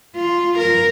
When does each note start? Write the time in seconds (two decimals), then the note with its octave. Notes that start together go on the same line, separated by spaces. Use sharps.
0.16 F4
0.58 A#4